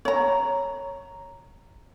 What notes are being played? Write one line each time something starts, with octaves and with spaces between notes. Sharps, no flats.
C#5 A#5